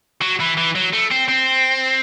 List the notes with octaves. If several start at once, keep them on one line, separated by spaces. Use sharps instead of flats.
F#3
E3
E3
F#3
A3
C4
C4